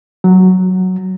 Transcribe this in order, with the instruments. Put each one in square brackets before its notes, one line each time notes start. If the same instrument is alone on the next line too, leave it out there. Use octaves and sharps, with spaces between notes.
[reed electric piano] F#3